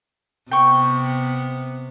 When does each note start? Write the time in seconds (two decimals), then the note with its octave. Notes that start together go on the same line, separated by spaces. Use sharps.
0.51 C3 B3 G5 C#6